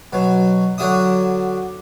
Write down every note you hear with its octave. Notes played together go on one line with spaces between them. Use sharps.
B2 F#3
D3 F#3 D4 E5 D#6